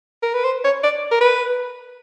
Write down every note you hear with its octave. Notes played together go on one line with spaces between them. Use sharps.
A#4
B4
C5
C#5
D5
A#4
B4